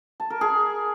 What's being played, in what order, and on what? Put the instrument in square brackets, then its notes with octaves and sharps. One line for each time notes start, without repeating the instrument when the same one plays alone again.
[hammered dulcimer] A5
A#4
G#4